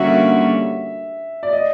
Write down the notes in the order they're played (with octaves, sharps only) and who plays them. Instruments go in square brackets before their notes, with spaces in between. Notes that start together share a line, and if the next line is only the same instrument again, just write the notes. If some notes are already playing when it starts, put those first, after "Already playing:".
Already playing: [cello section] D3 G3 A#3 C#4 F#4 [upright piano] E5
[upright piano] D5
D#5